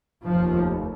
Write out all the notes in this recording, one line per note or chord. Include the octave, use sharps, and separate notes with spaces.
F1 D#2 F3